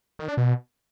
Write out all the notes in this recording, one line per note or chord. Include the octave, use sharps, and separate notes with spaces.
D#3
D4
B2